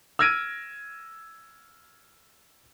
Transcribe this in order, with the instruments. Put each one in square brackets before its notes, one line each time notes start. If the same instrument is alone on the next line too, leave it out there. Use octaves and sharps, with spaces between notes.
[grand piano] E6 F6 G#6 A#6 D7 D#7